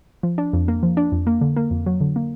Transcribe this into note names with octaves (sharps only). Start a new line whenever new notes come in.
F3
D4
F2
A#3
F3
D4
F2
A#3
D3
A#3
F2
F#3
D3
A#3